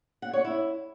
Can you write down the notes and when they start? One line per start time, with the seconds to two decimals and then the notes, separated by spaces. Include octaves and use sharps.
0.22 F#5
0.33 C#5
0.45 E4